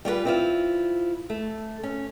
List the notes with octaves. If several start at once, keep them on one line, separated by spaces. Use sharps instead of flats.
G3 F4 F#4 B4
C4 E4 F4
A3
C#4